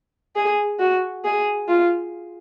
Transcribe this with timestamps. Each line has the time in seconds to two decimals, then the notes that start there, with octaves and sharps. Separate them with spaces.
0.36 G#4
0.79 F#4
1.24 G#4
1.68 F4